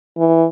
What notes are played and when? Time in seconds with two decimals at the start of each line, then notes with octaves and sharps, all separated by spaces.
0.17 E3